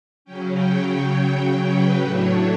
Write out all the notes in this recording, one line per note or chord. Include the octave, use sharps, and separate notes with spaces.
C#3 F#3 C#4 G5
G5
G5
G5
G5
B4
A2 F#3 A3 D4 C#5